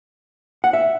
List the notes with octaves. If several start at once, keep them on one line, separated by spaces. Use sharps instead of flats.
F#5
E5